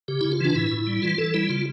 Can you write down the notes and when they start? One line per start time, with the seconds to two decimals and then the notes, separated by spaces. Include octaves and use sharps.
0.08 C#3 G4
0.21 C#3 E4
0.32 F4
0.40 E3 D4
0.55 A2 E4
0.71 A2
0.87 G3
1.02 E3 F4
1.18 E3 A4
1.34 G3 E4
1.49 C#3 F4